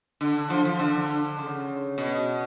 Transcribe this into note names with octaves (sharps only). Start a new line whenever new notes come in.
D3
F3
F3
D3
C#3
B2